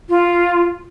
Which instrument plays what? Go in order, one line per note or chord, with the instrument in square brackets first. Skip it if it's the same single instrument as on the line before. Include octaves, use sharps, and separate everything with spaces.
[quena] F4